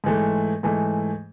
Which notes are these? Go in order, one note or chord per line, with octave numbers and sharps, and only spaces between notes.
G#2 E3 A3
G#2 E3 A3